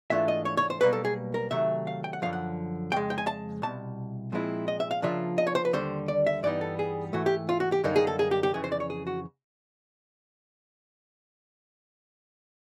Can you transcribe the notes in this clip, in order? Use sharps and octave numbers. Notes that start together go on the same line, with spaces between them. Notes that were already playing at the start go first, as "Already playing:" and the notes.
G#2 E3 A3 D4 F4 E5
D#5
C#5
C#5
C5
B1 B2 G3 A#3 B4
A4
G#4
A#4
C3 D#3 F#3 A3 E5
F5
G5
F#5
F#2 D3 F3 F5
F#5
F2 C#3 G#3 G5
G5
G#5
A5
C2 B2 A5
A#2 F3 G#3 C4 E4
D#5
E5
F5
C#3 F3 A#3 D4 F4 E5
D#5
C#5
C5
B4
D#2 D3 G3 C5
D5
E5
G2 E3 G3 B3 D#4 D5
A4
G#4
G#2 E3 A3 F#4
G4
F4
F#4
G4
F#2 D3 G3 A#3 D#4
G#4
A4
G#4
G4
G4
F2 C#3 E3 G#4
C5
D5
C#5
G#4
F#4